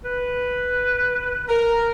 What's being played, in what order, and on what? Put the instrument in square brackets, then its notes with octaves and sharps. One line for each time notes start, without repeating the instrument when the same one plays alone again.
[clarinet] B4
[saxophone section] A#4